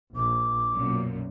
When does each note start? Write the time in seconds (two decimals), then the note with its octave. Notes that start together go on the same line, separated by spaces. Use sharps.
0.16 A#1 D6
0.75 B1 F#2 A#2